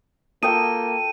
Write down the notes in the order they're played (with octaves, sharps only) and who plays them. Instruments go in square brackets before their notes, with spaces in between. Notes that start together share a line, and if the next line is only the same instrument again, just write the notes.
[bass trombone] A#3 [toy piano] F4 A5 D#6 [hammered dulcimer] A4 G5 [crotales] D#7